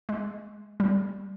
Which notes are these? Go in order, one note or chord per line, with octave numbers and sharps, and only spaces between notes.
G#3
G3